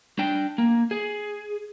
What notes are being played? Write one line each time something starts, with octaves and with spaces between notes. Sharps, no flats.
D4 G5
A#3
G#4